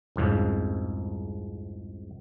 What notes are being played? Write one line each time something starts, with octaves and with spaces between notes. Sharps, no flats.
C2 F2 G#2 C#3